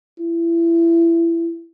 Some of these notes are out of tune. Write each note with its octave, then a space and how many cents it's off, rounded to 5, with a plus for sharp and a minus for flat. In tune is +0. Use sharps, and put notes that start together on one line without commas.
E4 +25